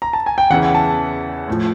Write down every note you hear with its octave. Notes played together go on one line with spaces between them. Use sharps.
A#5
A5
G#5
G5
E2 C#3 E3 F#5
A5
A2 F3